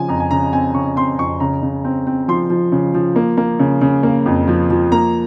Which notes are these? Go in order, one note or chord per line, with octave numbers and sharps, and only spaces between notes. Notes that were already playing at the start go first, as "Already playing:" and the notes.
Already playing: C#3 F3 G#5
F2 A#5
G#5
C#3 A#5
C4 G#5
C#3 C#6
C4 C6
F2 C#6
C#3 A#5
C#3
C4
C4
F3 C6
F3
C#3
F3
A#3
A#3
C#3
C#3
A#3
F2
F3
F3
A#3 A#5